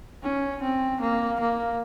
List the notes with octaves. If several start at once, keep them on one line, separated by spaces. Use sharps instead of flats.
C#4
C4
A#3
A#3